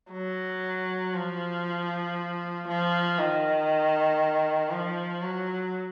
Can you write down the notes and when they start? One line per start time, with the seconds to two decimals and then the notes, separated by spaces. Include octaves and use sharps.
0.12 F#3
1.14 F3
2.68 F3
3.19 D#3
4.71 F3
5.22 F#3